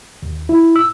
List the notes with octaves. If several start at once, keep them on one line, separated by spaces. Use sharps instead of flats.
D#2
E4
E6